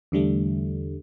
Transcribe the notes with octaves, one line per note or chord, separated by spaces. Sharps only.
E2 D3 G3 A3